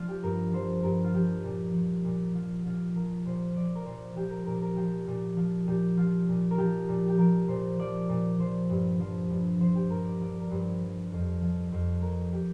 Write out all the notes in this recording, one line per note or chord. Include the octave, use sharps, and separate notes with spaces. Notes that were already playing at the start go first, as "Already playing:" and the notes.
Already playing: F3 F4 D5
G4
G2 A#4
F3 C5
G2 A#4
F4
F3 G4
A#2
F3
A#2
F3 F4
A#2 F4
F3 A#4
A#2 C5
F3 D5
A#4
A#2 C5
F3 G4
A#4
A#2 A#4
A#4
F3 G4
A#2
F3
A#2 G4
F3 F4
A#2
A#4
F3 G4
A#2
G4
F3 A#4
A#2 C5
F3 D5
A#2
F3 C5
G2
F3 C5
G2
F3 C5
G4
G2 A#4
D5
F3 D5
A#4
G2 C5
F3
F2
F3
F2
F3 A#4
G4